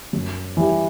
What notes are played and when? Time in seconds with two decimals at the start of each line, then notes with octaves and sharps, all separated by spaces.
0.13 F#2
0.57 E3 G3